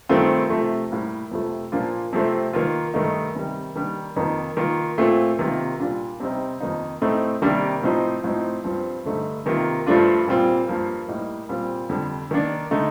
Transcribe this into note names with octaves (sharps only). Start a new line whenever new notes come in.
G2 D#3 A3 C4 F4
C3 F3 A3
A2 G3 A#3
F2 C3 F3 A3
A#2 F3 A#3 D4 F4
C3 F3 A3 C4
D#3 A#3 F4
G2 D#3 A3 D#4
C3 D#3 G3
D#3 G3 A#3 D4
F2 D#3 A#3 D#4
D#3 A#3 F4
A#2 A3 C4 F4
C3 D#3 A#3 F4
A#2 G3 D4 F4
C3 G3 C4 D#4
F2 D#3 A#3 D#4
A2 A3 C4 D#4
C3 D#3 G3 A#3 D4
A2 F3 C4 D#4
A2 F3 C4 D#4
G2 F3 C4
G2 D3 A3 D#4
C3 D#3 A#3 F4
G2 F3 A3 D4 F4
A#2 G3 C4 F4
G2 F3 A#3
A2 G3 A#3 D#4
A#2 G3 C4 F4
F2 D3 G3
D#3 A#3 D4
D3 A3 D#4